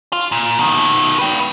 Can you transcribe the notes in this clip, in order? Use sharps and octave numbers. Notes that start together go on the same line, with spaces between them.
F4
A#2
B2 D#3
B4 G5